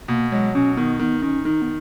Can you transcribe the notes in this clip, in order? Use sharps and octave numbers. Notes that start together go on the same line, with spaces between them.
B2 A#3
F#3 G#3
B2 C#4
D#3 B3
D#3 B3
D#3 C#4
D#3 D#4
B3